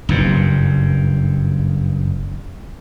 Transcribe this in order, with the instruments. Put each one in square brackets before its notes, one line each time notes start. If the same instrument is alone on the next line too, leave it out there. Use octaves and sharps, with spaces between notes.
[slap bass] F#1 G2 A#2